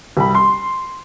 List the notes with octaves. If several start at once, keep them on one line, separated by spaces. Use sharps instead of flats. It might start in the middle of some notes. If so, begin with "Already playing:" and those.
C2 B5
C6